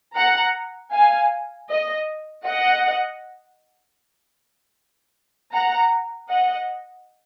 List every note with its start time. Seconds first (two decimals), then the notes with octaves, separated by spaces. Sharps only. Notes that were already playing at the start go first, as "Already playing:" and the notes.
0.16 F#5 A#5
0.92 F5 G#5
1.70 D#5
2.46 D#5 F#5
5.53 F#5 A#5
6.30 D#5 F#5